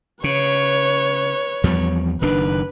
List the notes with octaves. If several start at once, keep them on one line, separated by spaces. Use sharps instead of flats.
C#3 B4 C#5
E2 F3 G3
F#1 D#3 D4 B4